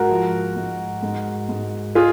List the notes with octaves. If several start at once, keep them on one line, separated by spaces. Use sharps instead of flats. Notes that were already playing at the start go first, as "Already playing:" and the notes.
Already playing: G#2 F#4 A#4
F3
G#2
G#2
G#2
G#3 F4 G#4